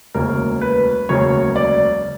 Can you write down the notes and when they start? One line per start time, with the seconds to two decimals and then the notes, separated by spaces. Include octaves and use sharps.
0.14 E1 D2 C#3 F#3 A#3 A#4
0.61 B4
1.09 E1 D2 C#3 F#3 A#3 C#5
1.56 D5